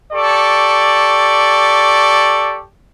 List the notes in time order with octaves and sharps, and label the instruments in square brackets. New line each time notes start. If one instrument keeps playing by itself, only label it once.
[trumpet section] G4 A4 D5 C#6